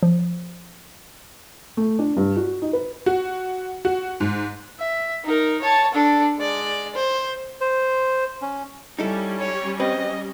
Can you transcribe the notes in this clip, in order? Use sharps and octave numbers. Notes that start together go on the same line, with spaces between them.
F3
A3
D4
G2
F#4
D#4
B4
F#4
F#4
G#2
E5
D#4 A#4
C#5 A5
D4 A4
G#3 D5
C5
C5
C#4
G3 C#4 D#4 E4 A4
C#5
C4 B4 D#5